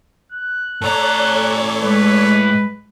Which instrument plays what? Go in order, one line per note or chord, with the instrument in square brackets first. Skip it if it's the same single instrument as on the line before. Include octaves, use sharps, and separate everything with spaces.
[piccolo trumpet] F#6
[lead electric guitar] A2 A#5 [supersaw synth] A4 C#5 D5
[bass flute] G#3 [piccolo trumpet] B4